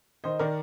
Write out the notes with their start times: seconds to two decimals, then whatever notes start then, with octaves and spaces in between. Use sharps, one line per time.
0.24 D#3 C5 D#5
0.39 D#3 A#4 D5